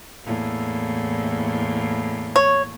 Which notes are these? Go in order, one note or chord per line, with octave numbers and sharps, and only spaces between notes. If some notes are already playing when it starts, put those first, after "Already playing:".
E2 A2 A#3
C#5